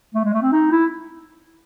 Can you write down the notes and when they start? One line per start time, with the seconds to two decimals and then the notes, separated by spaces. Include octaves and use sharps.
0.15 A3
0.24 G#3
0.33 A3
0.42 C4
0.52 D#4
0.71 E4